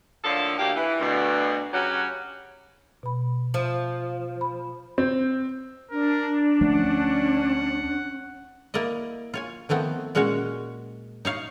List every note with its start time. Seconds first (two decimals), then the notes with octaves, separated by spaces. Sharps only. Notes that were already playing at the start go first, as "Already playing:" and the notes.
0.24 A2 D3 F3 A#3 A4
0.58 D2 A#3 G4
0.76 E3
1.00 D2 B2 D3
1.73 C#3 F#3 C#4 F#4 G4 F#5
3.03 B2 B5
3.54 F3
4.41 B5
4.98 C4
5.91 D4 A#4
6.61 D2 F3 A3 C#4 F#5
8.74 A#3 E4 D5 D#5
9.34 F4 C#5 G#5
9.69 D#3 F3 A3 B3 C4
10.15 A#2 G#3 C#4 F#4 C#5
11.25 D#4 C#5 F5